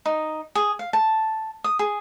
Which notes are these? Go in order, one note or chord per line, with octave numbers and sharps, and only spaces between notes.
D#4
G#4
F5
A5
D#6
G#4